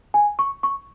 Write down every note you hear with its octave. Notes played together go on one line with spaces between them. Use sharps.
G#5
C#6
C#6